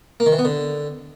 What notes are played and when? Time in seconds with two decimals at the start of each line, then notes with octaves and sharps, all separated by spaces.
0.20 A#3
0.26 D#3
0.32 E3
0.39 B3
0.45 D3